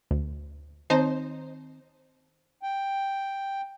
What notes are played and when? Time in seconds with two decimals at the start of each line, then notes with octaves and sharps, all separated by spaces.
0.11 D2
0.90 D#3 C4 D#4 C5
2.63 G5